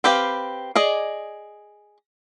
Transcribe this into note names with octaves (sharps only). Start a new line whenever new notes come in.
C4 G4 B4 F5 G5
G#4 D5 D#5